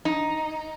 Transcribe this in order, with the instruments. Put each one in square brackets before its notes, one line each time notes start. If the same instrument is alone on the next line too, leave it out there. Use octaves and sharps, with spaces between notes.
[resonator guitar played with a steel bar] D#4